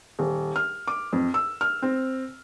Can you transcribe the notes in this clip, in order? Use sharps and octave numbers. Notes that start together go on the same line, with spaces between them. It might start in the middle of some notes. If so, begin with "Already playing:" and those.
D#1
F6
D6
F2
E6
F6
C4